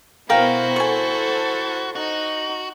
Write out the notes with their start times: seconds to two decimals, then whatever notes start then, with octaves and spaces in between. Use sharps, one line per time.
0.30 B2 B3 E4 F#4 A#4 C5 F5 G5
0.76 A4 G#5 C#6
1.96 D#4 F#4